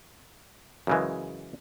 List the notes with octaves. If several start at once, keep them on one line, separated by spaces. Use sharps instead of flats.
F#2 C#3 E3 G#3